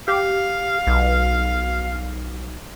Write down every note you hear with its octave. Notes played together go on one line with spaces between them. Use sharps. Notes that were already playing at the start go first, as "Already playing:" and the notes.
G4 F5
B1